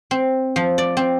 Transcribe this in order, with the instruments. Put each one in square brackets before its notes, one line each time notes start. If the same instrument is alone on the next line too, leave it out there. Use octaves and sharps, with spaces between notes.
[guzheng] C4
F3
D5
C4